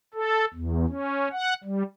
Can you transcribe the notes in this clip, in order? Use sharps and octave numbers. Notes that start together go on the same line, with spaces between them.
A4
E2
C#4
F#5
G3